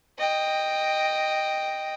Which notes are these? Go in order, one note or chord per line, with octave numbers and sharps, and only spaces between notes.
D#5 G5